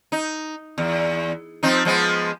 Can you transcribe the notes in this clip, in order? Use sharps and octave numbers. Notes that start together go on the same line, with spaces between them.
D#4
E2
F3 C4 D#4
F3 G#3 B3